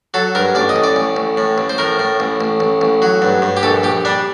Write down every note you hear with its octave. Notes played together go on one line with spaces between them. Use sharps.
F#3 A4
G2 A#4
A1 D5
D#5
A1
D5
A1
A1
A2
A1
C5
A2 A#4
A2
A1
A1
A1
A1
F#3
G2
G2
G4
A#1 A4
A#1 G4
G3 D4